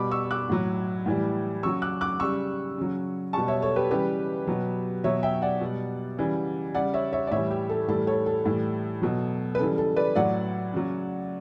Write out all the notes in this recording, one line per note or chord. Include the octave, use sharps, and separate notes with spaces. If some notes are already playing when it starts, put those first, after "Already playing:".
Already playing: B2 G3 B5 D6
C#6 E6
D6 F#6
A2 F#3
A2 E3 G3
C#3 F#3 C#6 E6
D6 F#6
D6 F#6
C#3 G3 C#6 E6
C#3 F#3
B2 G3 A5 C#6
C#5 E5
A4 C#5
G4 B4
C#3 E3 G3 G4 B4
B2 F#3
B2 F#3 C#5 E5
E5 G5
D5 F#5
B2 G3
C#3 E3 G3
C#3 G3 D5 F#5
C#5 E5
C#5 E5
D5
A2 E3 G3 C#5 E5
G4
A4
A2 E3 G3 A4
A4 C#5
A4
A2 E3 G3
B2 F#3
B4
C#3 E3 G3 A4
A4
B4 D5
A2 F#3 D5 F#5
C#3 F#3